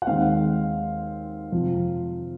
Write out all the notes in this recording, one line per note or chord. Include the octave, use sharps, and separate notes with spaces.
F#5
D#2 D#3 G#3 C4 F5
F2 C3 F3